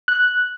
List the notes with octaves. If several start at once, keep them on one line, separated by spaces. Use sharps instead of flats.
F#6